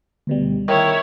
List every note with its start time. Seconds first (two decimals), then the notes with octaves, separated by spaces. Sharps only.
0.27 D2 B2 G3
0.68 D#3 E4 C#5 D#5